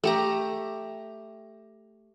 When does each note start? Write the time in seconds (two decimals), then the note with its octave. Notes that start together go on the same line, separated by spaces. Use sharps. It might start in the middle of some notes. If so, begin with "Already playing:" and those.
0.04 A3 G4 A#5